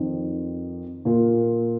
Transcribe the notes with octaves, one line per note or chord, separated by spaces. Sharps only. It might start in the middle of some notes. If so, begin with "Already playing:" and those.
Already playing: F2 D#3 C4 D#4
A#2 A#3 F4